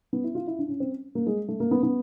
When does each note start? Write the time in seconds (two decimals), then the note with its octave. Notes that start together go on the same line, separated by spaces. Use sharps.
0.13 B3
0.24 E4
0.35 F4
0.47 E4
0.59 D4
0.69 C#4
0.80 C4
1.15 A#3
1.27 G#3
1.48 A3
1.60 A#3
1.71 B3
1.83 B3